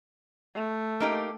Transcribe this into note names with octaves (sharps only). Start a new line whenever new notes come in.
A3
A#3 D#4 G4